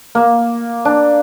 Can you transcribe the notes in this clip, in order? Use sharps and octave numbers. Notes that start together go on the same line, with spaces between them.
A#3
D4